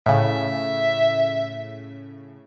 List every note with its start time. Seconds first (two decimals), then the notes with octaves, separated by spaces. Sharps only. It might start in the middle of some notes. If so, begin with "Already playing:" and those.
0.06 A2 C#3 E5